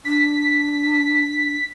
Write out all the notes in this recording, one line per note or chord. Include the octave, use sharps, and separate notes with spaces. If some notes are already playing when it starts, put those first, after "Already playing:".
D4 B6